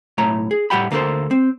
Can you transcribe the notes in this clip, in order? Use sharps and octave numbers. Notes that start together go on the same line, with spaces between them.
B1 A2 C#5 A#5
G#4
A2 G3 F#5 G5 B5
D2 A#3 B3 A4 C5
C4